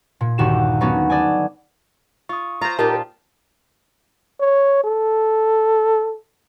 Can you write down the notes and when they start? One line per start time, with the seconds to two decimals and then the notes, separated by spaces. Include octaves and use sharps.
0.21 A#2
0.38 G1 D#2 F#4 G4 E7
0.81 F#3 A3 B3 C#4 D#4 F#4
1.10 A4 D5 D#5 G#5
2.29 F4 C#6 D#6
2.61 F4 C5 A#5
2.79 A#2 D#4 F4 G4 A#4 A5
4.40 C#5
4.84 A4